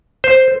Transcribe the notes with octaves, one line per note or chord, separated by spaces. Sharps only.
C5